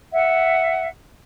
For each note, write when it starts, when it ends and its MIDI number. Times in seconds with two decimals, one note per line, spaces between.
0.13 0.88 76
0.13 0.88 78